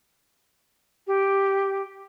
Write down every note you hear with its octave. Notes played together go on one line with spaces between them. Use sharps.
G4